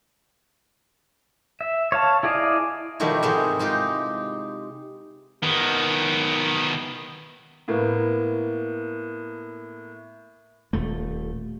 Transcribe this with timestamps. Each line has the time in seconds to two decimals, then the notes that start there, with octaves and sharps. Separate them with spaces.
1.61 E5
1.92 C#5 F5 A5
2.23 E4 G#4 D5 D#5 F5
3.00 B2 D#3 F3 G3 A3 E4
3.23 G#2 C3 G#3 E4
3.59 G#3 D#4 F4 G4
5.43 D#3 B3
7.68 A2 A#3 B3
10.73 D#1 A3